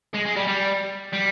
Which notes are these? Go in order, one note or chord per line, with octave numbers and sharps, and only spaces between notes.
G#3
G#3
G3
G3
G3